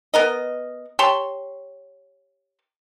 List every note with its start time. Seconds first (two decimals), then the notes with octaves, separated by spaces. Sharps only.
0.14 B3 A#4 D#5
0.99 G4 C#5 A5 C6